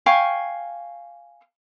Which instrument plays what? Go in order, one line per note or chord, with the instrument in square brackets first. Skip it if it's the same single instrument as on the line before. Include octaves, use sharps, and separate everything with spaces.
[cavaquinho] F5 G5 G#5 C#6